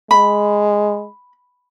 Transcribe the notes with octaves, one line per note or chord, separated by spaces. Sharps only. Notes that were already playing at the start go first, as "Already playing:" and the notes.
G#3 B5